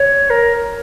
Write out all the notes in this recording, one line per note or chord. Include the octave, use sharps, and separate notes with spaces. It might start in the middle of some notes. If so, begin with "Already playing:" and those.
Already playing: C#5
A#4